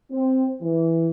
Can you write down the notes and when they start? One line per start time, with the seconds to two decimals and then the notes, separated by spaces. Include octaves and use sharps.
0.11 C4
0.61 E3